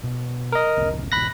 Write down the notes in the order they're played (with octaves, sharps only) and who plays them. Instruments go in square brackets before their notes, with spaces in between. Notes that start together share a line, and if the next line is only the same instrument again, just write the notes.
[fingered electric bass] B2
[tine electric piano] A#4 D#5
[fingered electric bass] E1 C2
[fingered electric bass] D#1 A#1 [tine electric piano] B5 F#6 A#6